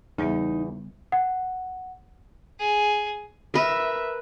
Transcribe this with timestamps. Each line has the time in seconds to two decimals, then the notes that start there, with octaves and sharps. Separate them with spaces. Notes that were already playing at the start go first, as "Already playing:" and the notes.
0.18 E2 C#3 G3 B3 D#4
1.12 F#5
2.59 G#4
3.54 A#4 B4 E5